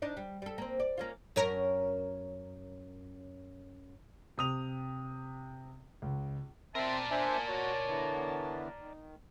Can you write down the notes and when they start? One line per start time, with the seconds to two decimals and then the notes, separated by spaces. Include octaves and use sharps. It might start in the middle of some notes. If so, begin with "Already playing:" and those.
0.02 D4 D#4 D5
0.17 G3
0.42 G3 A4
0.58 A#3 C4
0.80 D5
0.97 A#3 C#4 F4
1.36 F#2 C#4 A#4
4.38 C3 D#6 F7
6.02 C#2
6.75 C4 A#4 D5 E5 A5 C6
7.11 D4 C5 E5 G#5
7.48 F#4 C#5
7.87 D3 E3 B3
8.80 D#3